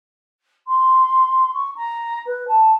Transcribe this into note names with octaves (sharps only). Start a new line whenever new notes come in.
C6
C#6
A#5
B4
A5